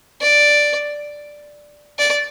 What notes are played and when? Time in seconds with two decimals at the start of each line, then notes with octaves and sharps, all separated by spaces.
0.21 D5
1.99 D5